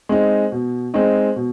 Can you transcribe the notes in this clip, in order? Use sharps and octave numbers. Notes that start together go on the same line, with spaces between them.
G#3 C4 D#4
B2
G#3 C4 D#4
B2